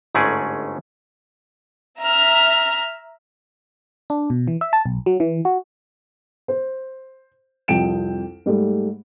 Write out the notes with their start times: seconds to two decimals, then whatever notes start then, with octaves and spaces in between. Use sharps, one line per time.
0.15 G1 G#2 A3 C#4 G#4 D5
1.99 E5 A#5 F6
4.10 D4
4.30 B2
4.48 E3
4.61 E5
4.73 A5
4.86 B1
5.06 F#3
5.20 E3
5.45 F#4
6.48 C5
7.68 C2 F2 G5 D7 E7
8.46 G#2 G3 A3